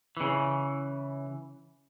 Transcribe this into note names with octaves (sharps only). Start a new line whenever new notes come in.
C#3 E3